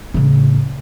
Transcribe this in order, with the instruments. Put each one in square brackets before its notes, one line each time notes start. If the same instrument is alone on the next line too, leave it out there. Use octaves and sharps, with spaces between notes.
[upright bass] A2 C#3